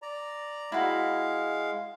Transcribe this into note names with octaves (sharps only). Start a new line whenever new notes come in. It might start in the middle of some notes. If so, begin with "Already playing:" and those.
D5 A#5
G#3 E4 F#4 F5